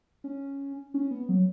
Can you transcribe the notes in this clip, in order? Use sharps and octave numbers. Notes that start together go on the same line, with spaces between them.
C#4
C#4
B3
F#3